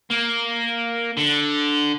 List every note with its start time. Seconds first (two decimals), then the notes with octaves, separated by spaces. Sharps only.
0.10 A#3
1.17 D3